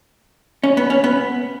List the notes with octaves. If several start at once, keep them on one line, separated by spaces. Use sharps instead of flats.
C#4
B3
C#4
B3